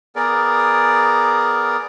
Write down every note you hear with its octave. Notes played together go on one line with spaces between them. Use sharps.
B3 G#4 A#4 D5